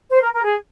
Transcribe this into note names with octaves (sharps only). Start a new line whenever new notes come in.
C5
A#4
A#4
G#4